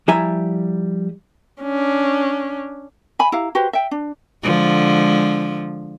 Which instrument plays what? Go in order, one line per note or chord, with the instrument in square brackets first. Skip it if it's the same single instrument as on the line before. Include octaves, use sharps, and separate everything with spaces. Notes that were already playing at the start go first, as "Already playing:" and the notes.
[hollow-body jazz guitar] F3 G3 E4 E5 G#5 A#5
[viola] C#4 D4
[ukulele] E5 G#5 B5
E4 G4 F5 A#5
F#4 G4 B4 C5
E5 G5
D4
[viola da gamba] D3 F3 G#3